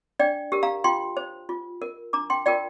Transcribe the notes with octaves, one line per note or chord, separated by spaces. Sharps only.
D4 D5 G5
G4 A#4
F5 A#5
F4 G5 C6
C5
F4
A#4
D4 A#5 D6
G5 C6
F4 A#4 D5 G5